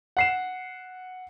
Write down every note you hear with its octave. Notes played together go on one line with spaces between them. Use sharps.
F#5 C7 E7